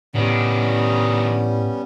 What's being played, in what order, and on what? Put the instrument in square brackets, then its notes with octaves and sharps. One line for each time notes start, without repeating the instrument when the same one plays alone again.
[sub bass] A2 [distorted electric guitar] D#3 D4 [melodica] G3 B3 C#4